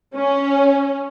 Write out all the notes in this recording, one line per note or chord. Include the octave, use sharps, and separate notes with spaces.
C#4